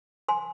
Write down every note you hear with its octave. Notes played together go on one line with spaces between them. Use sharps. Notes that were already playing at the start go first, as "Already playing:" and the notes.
G#5 C6